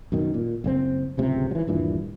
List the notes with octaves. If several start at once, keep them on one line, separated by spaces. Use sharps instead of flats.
F#2 B2 D#3
A#2
F#1 C#3 C4
D1 C#2 C3
E3 F#3
D#1 G2 A#2 E3